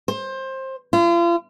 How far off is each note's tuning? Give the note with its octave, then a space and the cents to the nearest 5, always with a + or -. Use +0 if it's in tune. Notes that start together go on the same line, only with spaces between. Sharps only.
C5 +20
F4 -40